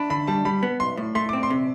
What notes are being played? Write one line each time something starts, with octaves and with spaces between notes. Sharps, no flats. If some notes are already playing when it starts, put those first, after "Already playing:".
Already playing: D4 A5 B5
D3 B5
G3 A5
G3 B5
B3
B1 C6
A2
A3 C6
C4 D6
C6
C3